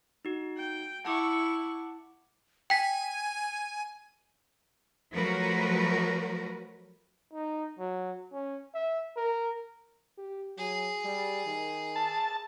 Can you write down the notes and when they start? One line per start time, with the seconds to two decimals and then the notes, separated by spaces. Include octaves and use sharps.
0.25 D#4 F#4
0.57 G5
1.05 E4 F#5 A5 C#6 D6
2.70 G5 G#5 B6
5.13 F3 F#3 A3 F#4 A#4 B4
7.33 D#4
7.79 F#3
8.32 C#4
8.75 E5
9.17 A#4
10.18 G4
10.58 F#3 G#4
11.05 G3
11.46 D#3
11.96 A5